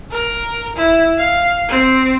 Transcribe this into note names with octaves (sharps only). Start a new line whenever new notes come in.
A#4
E4
F5
C4